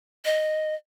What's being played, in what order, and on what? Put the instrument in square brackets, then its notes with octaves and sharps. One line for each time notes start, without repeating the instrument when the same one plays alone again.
[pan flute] D#5